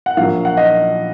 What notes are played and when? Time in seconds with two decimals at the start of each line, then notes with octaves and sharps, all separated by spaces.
0.06 F#5
0.17 A#1 A#2 F#3 F5
0.45 F#5
0.57 D#5